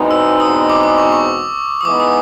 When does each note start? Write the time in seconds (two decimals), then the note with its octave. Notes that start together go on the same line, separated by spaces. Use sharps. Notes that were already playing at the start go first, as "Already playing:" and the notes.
Already playing: E2 B2 G#3 C4 D#4
0.11 E6
0.40 D#6
0.70 D6
0.83 D6
0.98 C#6
1.13 C#6
1.81 D#6
1.85 E3 G#3 B3 D#4 D6
2.00 D#6